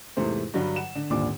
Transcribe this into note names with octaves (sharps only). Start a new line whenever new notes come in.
E2 G#2 C3 A3 C5
G2 D3 F#3 G3
F#5 E7
D3
D#1 G#1 A#2 D3 D4 D6